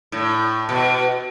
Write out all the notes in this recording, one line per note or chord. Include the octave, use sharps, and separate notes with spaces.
A2
B2